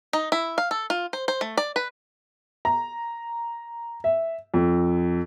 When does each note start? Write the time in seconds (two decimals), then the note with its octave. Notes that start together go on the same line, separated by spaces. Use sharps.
0.13 D#4
0.32 E4
0.58 F5
0.71 A4
0.90 F4
1.13 C5
1.28 C5
1.41 A3
1.57 D5
1.76 B4
2.65 A#5
4.04 E5
4.54 F2